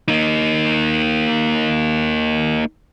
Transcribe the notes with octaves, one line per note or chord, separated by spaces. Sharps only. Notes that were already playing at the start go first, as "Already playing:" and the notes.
A#3 D#4